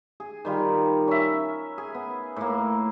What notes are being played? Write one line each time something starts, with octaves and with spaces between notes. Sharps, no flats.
G#4
D#3 G3 F4
C#4 E5
G#4
B3
A2 A#3